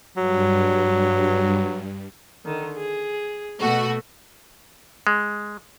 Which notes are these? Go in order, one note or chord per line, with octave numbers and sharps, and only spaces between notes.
G2 F#3
D3 D#3
G#4
B2 A3 F#4
G#3